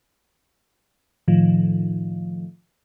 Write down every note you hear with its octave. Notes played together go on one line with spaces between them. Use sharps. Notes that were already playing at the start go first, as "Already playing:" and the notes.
A2 D#3 F3